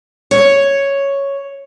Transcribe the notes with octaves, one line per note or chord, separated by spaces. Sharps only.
C#5